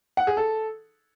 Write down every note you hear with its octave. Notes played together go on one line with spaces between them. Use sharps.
F#5
G#4
A4